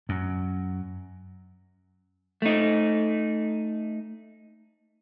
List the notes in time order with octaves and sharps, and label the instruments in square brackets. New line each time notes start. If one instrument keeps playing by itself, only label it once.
[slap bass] F#2
[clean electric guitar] A3 D#4